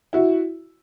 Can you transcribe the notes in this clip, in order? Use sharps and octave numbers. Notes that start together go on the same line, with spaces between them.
E4 F#4